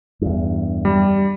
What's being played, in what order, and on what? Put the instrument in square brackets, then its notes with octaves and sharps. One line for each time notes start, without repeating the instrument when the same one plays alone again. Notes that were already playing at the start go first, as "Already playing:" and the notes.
[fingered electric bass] E2 G2
[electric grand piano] G3